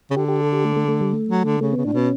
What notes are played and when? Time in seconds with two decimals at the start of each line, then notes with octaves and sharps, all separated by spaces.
0.11 C#3
0.16 D3 G4
0.28 G4
0.40 A4
0.52 G4
0.64 A3
0.76 A3
0.88 A3
1.01 G3
1.13 A3
1.29 F#3
1.45 D3
1.61 C#3 A3
1.73 C#3 B3
1.85 A2 D4
1.93 B2 C#4